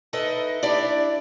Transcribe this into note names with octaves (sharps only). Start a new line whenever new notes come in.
D#4 E4 A4 B4 D#5
D4 E4 G4 D5